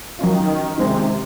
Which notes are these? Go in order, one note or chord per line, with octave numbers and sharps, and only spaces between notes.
D#3 F#3 C#4 F4
C3 D#3 G#3 C4 D#4